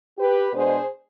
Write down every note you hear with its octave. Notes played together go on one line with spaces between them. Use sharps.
G4 B4
B2 G#3 D4 G#4 C5